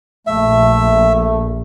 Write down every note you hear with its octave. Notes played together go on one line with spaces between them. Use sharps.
A#1 A3 E5